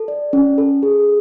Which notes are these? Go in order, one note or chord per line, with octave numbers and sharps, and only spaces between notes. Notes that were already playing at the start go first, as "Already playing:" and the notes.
Already playing: A4
D5
C#4
A4
G#4